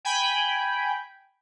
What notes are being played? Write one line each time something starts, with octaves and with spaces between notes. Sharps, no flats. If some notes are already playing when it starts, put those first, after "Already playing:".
G5 G#5 B5